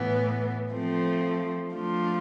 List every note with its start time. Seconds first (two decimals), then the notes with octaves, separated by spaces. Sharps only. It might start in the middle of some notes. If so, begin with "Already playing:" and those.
Already playing: A2 E3 B3
0.71 F3 A3 C4
1.73 F3 A3 D4 F4